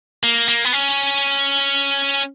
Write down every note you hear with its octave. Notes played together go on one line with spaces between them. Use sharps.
A#3
A#3
B3
C#4